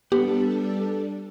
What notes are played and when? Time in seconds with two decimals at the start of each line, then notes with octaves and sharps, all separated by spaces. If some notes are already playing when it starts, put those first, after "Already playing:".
0.12 G3 B3 D4 G4 A4